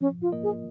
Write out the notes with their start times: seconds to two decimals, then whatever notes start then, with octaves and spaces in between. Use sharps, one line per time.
0.01 F3 C#4
0.22 F4
0.32 A#3 F4 A#4 D#5
0.43 G#4